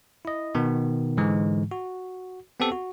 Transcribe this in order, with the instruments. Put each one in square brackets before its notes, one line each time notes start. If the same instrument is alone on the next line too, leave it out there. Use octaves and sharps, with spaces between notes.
[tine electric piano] E4 D#5
B2 D#3 B3
G#2 D3 E3 G#3
F#4
B3 C4 G4 A4
F#4